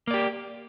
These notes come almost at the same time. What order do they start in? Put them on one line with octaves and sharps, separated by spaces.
A#3 D5 G4